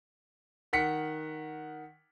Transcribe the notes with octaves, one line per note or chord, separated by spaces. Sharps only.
D#3 F#5 B6 C#7